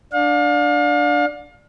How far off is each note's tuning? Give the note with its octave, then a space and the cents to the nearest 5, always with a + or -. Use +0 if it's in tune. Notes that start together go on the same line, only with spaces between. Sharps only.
D4 +0 F5 +35